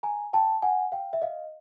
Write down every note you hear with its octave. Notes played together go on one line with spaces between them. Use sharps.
G#5 A#5
G5 A5
F#5 G#5
F5 G5
E5
D#5 F5